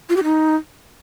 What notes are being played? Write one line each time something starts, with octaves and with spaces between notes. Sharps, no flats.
F4
G4
D#4